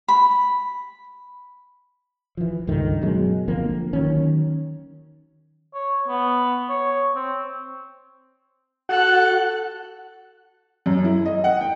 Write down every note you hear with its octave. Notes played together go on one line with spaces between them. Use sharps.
B5
E3 F3
C#2 G2 D3 D#3
F#2 B2 F#3 G#3
D3 F3 A#3 C4
D#3 F#3 C#4
C#5
B3
C#5
C4
F#4 A4 F#5 F#6
F#2
E4
D#5
F#5
G5